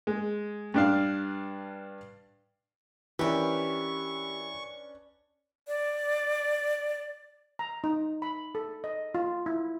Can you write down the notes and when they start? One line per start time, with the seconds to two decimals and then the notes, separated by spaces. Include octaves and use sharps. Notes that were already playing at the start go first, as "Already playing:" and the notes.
0.07 G#3
0.74 G2 D4 F5
3.19 E3 C#4 D4 G4 A#4 B4 C#6
5.68 D5
7.59 A#5
7.84 D#4
8.22 B5
8.55 A4
8.84 D#5
9.15 F4
9.46 E4